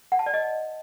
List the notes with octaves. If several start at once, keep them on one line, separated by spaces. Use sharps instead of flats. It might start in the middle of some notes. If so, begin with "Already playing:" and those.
F#5
A5
D5
D#5